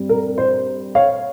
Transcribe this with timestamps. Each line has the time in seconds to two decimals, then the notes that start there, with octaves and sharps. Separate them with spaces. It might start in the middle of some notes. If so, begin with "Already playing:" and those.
Already playing: G2 G3 C4
0.09 A#4
0.38 C5
0.95 C#5 F5